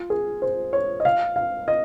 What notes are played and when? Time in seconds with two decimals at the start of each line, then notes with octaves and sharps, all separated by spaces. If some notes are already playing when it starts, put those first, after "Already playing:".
Already playing: F4
0.10 G#4
0.42 C5
0.73 C#5
1.00 D#5
1.05 F5
1.36 F5
1.68 D#5